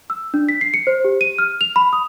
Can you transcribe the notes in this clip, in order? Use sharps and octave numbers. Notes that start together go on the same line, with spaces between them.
E6
D4
B6
C7
C#7
C5
G4
D#7
F6
F7
B5
D#6